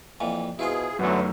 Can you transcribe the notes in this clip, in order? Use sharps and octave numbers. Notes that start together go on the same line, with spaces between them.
F2 A#2 E3
B2 E4 F4 G#4 C5
F#2 D3 E3 F#3 A3 B3